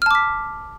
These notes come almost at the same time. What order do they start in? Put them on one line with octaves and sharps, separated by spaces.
F6 A5 D6 B6